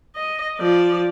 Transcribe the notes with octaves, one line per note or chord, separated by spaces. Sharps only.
D#5
F3 D5